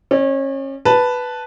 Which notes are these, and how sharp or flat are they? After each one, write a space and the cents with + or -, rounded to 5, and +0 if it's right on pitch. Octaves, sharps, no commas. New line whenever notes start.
C#4 -30 D5 +25
B4 +0 A5 +0